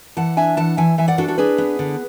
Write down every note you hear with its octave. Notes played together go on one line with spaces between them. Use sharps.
E3 F#5 A5
D4 E5 G#5
E3 F#5 A5
E3 E5 G#5
E3 E5 G#5
D5 F#5
D4 F#4 A4
F#4 A4
D4 G#4 B4
B3
D3